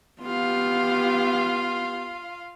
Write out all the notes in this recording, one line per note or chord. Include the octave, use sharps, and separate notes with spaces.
B3 F4 G4 F5